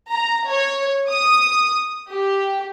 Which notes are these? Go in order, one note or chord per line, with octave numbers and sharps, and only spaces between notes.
A#5
C#5
D#6
G4